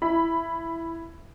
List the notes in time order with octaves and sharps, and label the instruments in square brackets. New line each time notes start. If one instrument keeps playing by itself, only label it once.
[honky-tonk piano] E4 B5